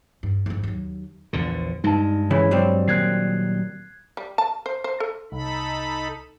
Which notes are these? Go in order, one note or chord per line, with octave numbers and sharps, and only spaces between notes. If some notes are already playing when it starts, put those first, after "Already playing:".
G2
G#1 F2
D#2 F#3
A#1 E2 D3
G2 G#3 D#4 A5
C#3 E3 E4 C#5 B5
F#3 G3 C4
A#2 D#3 F#6 G#6 C7
G3
A5
C5
C5
A4
C2 D#4 A4 B5